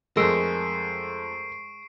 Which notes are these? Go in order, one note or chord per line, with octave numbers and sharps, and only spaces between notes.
F2 G#3 A3 A#4 C#6 E6 C7 D7